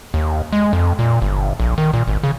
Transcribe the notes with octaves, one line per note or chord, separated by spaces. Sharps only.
D#2
G#3
F2
A#2
G1
A#1
D#3
A#2
G#1
C#3